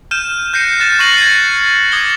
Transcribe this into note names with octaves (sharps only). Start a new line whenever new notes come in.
F6 G6 D#7 E7
F#6 G6 A#6 C7 C#7 D#7
F#6 A6 E7
C#6 F#6 A#6 C7 D#7 F#7
G#6 C#7
D6 D#6 G#6 C#7 G7